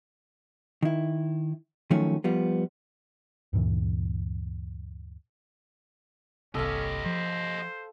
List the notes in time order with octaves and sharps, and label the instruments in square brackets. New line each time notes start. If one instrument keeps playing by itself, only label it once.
[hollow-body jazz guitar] D#3 E4
D#3 F3 F#3 A3 C#4
F3 G3 B3
[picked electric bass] D2 G2 A#2 E3
[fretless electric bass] G1 C2 C3 [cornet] C#4 [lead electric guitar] G4 D#5 [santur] A4 F5
[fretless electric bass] F3 [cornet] C5